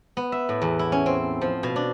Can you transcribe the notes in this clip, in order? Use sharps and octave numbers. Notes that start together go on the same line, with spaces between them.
B3
E5
A2
E2
E4
C#4
C4
F3
B2
D4